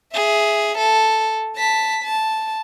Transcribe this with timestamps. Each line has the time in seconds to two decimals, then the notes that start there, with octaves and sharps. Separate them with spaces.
0.14 G#4 E5
0.78 A4
1.56 A5 B6
2.03 A5